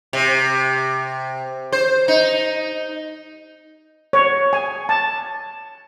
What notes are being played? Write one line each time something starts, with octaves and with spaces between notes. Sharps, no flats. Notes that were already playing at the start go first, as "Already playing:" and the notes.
C3
C5
D#4
C#5
G#5
A5